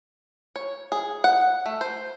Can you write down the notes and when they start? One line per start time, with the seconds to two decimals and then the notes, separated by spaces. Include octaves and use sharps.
0.56 C#5
0.92 G#4
1.24 F#5
1.66 A3
1.81 C5